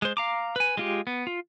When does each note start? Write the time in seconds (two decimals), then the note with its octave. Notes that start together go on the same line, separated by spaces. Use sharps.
0.02 G#3 C5
0.17 F5 A#5 D6
0.56 B4 G#5
0.77 G#3 F4 G4
1.07 B3
1.27 F4